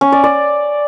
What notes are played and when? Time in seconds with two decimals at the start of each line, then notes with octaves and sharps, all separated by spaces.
0.01 C#4
0.12 D5
0.24 D5